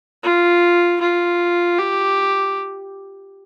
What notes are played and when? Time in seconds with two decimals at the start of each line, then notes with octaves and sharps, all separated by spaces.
0.24 F4
1.00 F4
1.78 G4